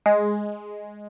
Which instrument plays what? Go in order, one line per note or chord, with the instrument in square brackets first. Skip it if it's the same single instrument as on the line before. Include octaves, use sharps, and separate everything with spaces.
[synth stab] G#3